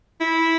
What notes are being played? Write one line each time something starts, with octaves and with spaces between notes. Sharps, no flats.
E4